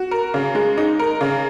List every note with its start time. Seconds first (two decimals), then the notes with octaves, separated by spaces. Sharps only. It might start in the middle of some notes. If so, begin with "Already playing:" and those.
Already playing: F#4
0.11 A#4
0.34 C#3
0.55 G#3
0.77 D#4
0.99 A#4
1.21 C#3